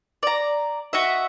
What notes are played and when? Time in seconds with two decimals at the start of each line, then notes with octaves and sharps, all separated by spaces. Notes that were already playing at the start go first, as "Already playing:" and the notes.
0.23 D5 A#5
0.93 F#4 D#5 E5